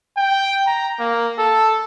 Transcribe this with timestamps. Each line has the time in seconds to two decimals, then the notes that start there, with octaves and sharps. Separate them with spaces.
0.17 G5
0.67 A#5
0.99 A#3
1.38 A4